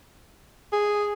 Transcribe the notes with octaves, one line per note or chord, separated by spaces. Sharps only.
G#4